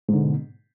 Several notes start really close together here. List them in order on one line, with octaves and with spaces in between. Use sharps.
G#2 D3 B2